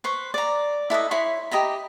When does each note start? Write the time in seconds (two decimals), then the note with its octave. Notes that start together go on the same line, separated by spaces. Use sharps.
0.04 B4 C5 C#6
0.34 D5 A#5
0.90 E4 A4 B4 D#5
1.11 E4 C#5 B5 C6
1.51 G4 D#5 A#5 B5